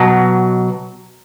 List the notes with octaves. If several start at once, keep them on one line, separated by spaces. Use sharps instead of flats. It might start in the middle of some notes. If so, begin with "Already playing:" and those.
Already playing: B2 F#3